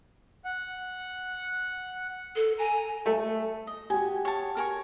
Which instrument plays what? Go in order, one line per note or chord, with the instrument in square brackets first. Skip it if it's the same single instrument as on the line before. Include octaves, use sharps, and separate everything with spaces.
[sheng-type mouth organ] F#5
[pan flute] A4
[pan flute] G#5 [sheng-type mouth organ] A#5
[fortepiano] A3
[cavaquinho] D#5
[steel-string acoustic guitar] F#4 G4 [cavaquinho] G#5
[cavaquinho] C#5 A5
A#4 G#5 C#6